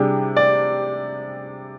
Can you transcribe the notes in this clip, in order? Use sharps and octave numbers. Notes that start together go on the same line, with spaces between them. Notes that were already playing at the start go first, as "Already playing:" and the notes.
Already playing: C3 G3 D4 G4 G#4
D5